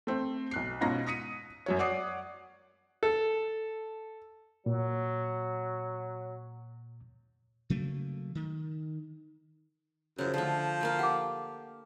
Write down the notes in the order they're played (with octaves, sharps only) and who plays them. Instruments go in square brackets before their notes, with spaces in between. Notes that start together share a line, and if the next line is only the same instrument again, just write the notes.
[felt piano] A3 C4
B1 F#6 C7
G#2 B2 C#4 F4 A#5 A#6
D#6 A#6 B6 C#7 D#7
F#2 F#3 C#5
C#5 D5 F#5 D6 D#6 C7
[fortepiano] A4
[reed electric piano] A#2 [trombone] F#3
[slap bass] C#3 F#3 A3 A#3
D#3
[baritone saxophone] F#2 [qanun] C#3 F3
[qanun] D3 A3 [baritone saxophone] F3
[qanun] A3 A#3 F5
[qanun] G4 [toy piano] F#5 D6